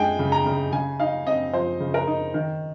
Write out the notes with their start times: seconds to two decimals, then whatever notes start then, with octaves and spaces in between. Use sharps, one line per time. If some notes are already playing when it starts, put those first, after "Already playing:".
Already playing: G#3 D#4 G5 G#5
0.19 C#3
0.32 A#5
0.46 C#3
0.72 C#3 G#5
1.00 D#4 F5
1.26 C4 D#5
1.53 F3 C5
1.80 C#3
1.94 A#4
2.07 D#4
2.34 D#3